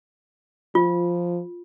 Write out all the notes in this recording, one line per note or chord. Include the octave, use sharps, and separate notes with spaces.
F3 F4